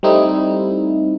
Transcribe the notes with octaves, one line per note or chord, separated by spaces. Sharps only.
G3 A3 C4 D#4 E4